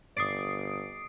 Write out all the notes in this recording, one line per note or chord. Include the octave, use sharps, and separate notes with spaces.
G1 D5 D#6 C7 D7